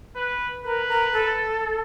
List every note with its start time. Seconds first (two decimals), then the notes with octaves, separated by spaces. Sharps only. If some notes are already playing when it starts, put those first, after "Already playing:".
0.16 B4
0.64 A#4 B4
0.88 A#4
1.13 A4